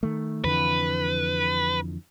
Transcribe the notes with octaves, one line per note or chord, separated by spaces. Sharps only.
D#3 A3
F2 D3 E3 B4